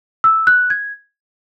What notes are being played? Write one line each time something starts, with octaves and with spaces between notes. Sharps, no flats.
E6
F#6
G#6